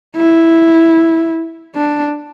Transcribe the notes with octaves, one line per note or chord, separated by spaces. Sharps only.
E4
D4